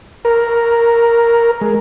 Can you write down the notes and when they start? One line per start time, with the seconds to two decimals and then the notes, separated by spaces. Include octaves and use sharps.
0.25 A#4
1.61 G#3